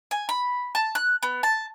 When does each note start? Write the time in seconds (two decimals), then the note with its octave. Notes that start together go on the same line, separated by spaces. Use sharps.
0.11 G#5
0.29 B5
0.75 A5
0.95 F#6
1.23 B3
1.43 A5